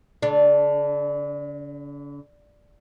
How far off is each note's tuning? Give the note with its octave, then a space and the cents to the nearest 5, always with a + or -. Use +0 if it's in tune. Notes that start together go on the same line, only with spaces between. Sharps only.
D3 -45 D4 +0